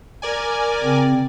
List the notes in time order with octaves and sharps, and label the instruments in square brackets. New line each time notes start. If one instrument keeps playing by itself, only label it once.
[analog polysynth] A#4 D5 G#5
[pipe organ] C#3 C4